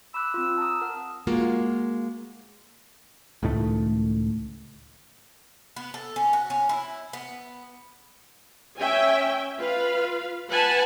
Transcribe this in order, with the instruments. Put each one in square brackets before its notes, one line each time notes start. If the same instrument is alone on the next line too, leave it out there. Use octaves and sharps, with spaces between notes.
[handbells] B5 D6 F#6 [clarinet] E6
[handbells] C4 F4
A5 A#5 D#6
A#4 F#5 F6
[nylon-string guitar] G#3 A#3 F4 F#4
[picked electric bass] C#2 A2 D#3 A3
[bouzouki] B3
A4
C#4
F#4
C#4
E4
B3
[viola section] C#4 E5 G5 G#5
F4 B4 F5
B4 F#5 G#5 A5